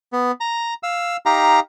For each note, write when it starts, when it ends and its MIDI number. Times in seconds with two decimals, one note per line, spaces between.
0.12 0.32 59
0.40 0.74 82
0.83 1.17 77
0.83 1.17 88
1.26 1.60 63
1.26 1.60 67
1.26 1.60 77
1.26 1.60 82